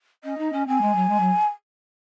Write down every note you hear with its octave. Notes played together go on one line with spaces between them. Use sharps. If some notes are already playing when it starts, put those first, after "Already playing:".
C#4 D#5
D#4
C#4
C4 G#5
G#3
F#3
G#3
F#3